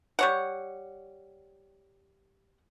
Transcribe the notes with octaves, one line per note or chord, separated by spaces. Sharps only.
G3 C#5 F#5